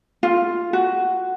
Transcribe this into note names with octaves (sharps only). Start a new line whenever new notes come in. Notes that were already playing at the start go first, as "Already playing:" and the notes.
F4
F#4